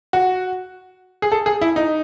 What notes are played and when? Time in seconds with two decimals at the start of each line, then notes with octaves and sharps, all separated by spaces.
0.13 F#4
1.22 G#4
1.32 A4
1.46 G#4
1.61 E4
1.76 D#4